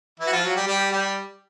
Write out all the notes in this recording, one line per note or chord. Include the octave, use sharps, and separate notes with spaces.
E3 E4
F#4
F3 F4
F#3 F#4
G3 G4
G3 G4
G3 G4